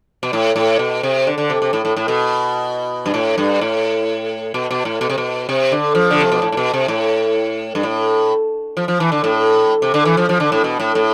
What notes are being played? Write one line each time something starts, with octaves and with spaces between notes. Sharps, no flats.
B2
A2
A2
B2
C3
D3
D3
C3
C3
A2
A2
A2
B2
G2
A2
G2
A2
B2
B2
A2
B2
C3
B2
C3
D3
F3
D3
C3
B2
A2
A2
B2
C3
A2
G2
A2
F3
F3
E3
D3
A2
C3
D3
E3
F3
F3
D3
A2
B2
A2
A2